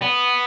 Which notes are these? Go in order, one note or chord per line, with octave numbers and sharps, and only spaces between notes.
B3